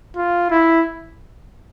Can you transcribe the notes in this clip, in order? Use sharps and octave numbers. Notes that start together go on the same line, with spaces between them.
F4
E4